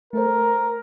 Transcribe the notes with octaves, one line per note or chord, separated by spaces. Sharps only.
A3 A4 A#4 C5